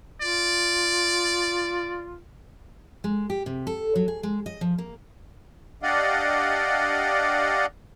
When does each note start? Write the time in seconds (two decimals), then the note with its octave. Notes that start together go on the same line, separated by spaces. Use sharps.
0.21 F4 D5
3.04 G#3
3.30 G4
3.46 C3
3.67 A4
3.95 F#3
4.08 G#4
4.23 G#3
4.46 D#5
4.61 F3
4.78 A#3
5.83 D4 G4 D5 D#5 F5 F#5